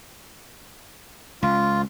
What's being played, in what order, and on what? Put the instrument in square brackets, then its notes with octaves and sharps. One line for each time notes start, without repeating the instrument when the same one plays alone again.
[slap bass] C#2 [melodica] F4